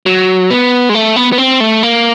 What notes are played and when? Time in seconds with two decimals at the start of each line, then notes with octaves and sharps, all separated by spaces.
0.06 F#3
0.50 B3
0.89 G#3
0.95 A3
1.16 B3
1.32 B3
1.38 C4
1.60 A3
1.83 A#3